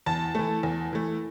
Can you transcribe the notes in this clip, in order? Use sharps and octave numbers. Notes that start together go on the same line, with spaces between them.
E2 A5
E3 A3
E2
E3 A3